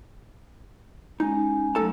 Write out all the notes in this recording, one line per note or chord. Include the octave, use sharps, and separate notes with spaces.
G#3 C#4 D#4 G#5
F#3 A3 D#4 A4 A5